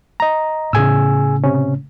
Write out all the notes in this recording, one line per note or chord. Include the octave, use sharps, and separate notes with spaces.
D#5 A#5
A2 C#3 G#4 G#5 E6
C3 C#4